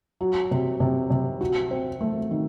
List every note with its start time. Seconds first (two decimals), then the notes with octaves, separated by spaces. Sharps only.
0.21 F#3
0.51 C3
0.80 C3
1.10 C3
1.41 F#4
1.71 C4
2.01 A3
2.31 D#3